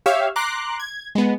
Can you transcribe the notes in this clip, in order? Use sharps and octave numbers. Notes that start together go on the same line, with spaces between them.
G4 C#5 E5 F5
A#5 C6 D6 F#6
G#6
G#3 B3